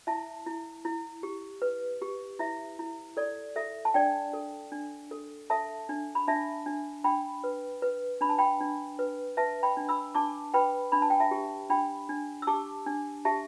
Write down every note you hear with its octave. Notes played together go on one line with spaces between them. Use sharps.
E4 E5 A5
E4
E4
G4
B4
G4
E4 E5
E4
A4 D5
A4 E5
A5
D4 D5 G5
A4
D4
A4
A4 E5 A5
D4
B5
D4 E5 A5
D4
D4 G5 B5
B4
B4
D4 B5
A5
G5 B5
D4
B4
B4 E5 A5
G5 B5
D4
B5 E6
D4 A5 D6
B4 G5 B5
D4 B5
A5
G5
E5 A5
G4
D4 G5 B5
D4
E6
G4 A5 D6
D4
G4 E5 A5